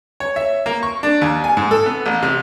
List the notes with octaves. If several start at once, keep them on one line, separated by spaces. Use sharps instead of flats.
C#5
E5
A#3
C#6
D4
D#2
G#5
G#2
A4
B3
A1
C3